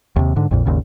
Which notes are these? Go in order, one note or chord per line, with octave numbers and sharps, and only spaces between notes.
D#2 C3
G#2 D3
A#1 F2 A#2
G#1 D#2 C#3